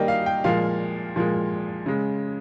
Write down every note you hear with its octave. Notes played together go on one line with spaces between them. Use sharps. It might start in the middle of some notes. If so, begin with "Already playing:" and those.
Already playing: D#3 G3 A#3 D#5 G5
F5
G5
A#2 F3 G#3 F5
A#2 F3 G#3
C#3 G#3